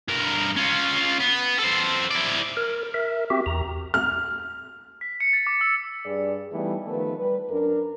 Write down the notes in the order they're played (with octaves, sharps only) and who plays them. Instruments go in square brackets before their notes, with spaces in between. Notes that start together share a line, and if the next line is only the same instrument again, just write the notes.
[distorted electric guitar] G2 A#4
C#4 F4
B3
A4 C5
E4 D5
[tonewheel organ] A#4
A#4 E5
C4 F#4 G4 E5
E2 A#5
[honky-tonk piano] F6
[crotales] B6
C#7
A6
D6
E6
[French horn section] G2 G#4 D5
E3 G3 A3 B3 D#4
D#3 F3 A3 B3 B4
G3 B4
F#2 D4 A#4